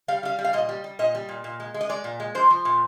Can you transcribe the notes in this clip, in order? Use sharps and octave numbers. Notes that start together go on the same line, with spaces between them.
G3 F5
G3 F5
G3
F5
A#2 D#5
G3
G3
A#2 D#5
G3
A#2
A#2
G#3
G#3
D#5
G#3 D5
A#2
G#3
F3 C5
F3
A#2